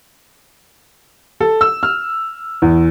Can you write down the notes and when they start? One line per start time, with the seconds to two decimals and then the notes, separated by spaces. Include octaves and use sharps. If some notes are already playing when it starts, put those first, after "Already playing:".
1.40 A4
1.61 E6
1.83 F6
2.62 E2